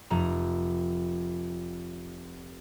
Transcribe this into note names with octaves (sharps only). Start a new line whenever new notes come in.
F1 A#5